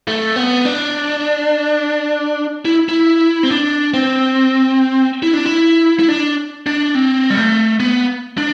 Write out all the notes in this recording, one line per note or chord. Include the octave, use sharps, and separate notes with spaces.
A3
B3
D4
E4
E4
C4
D4
C4
E4
D4
E4
E4
D4
D4
C4
G3
A3
B3
D4